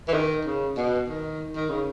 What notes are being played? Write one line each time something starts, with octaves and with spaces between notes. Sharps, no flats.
E3
D#3
C#3
B2
D#3
D#3
C#3